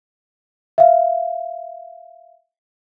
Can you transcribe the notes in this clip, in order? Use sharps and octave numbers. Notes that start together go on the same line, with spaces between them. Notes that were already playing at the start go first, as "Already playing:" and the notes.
E5 F5